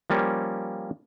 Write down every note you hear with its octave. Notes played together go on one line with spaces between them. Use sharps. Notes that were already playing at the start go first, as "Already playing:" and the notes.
F3 G3 A#3 C#4